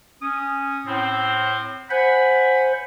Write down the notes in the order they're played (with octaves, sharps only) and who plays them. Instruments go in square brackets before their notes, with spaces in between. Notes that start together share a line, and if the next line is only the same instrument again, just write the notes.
[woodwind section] C#4 D#6
A2 C4
[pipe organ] C5 [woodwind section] F#5 G#5 B5